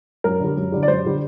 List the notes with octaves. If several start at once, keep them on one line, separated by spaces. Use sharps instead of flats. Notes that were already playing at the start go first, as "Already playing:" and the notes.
F#2 A#4
D3 G3
F#2
D3 G3
D5
F#2 C5
D3 G3